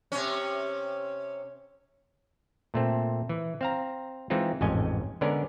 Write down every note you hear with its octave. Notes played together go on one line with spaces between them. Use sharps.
C3 C#4
A#2 A3 C4
E3
C4 F5 A#5
E3 G#3 C4 D#4 F4
A1 F2 G#2 C#4 D#5 G#5
D3 G#3 B3 C#4 A#4 D5